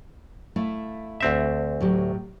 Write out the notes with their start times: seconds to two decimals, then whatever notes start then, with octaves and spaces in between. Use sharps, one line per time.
0.56 A3 E4 F5
1.21 D2 C4 E5
1.81 A2 F#3 G4